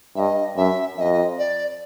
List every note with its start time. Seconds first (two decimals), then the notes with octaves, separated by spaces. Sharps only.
0.16 G2 D#5 E5
0.56 F#2 E5
0.97 F2 D#5 E5
1.38 D5